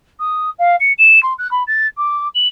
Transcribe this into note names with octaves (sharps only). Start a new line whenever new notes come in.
D#6
F5
C#7
E7
C6
F#6
B5
A6
D6
F#7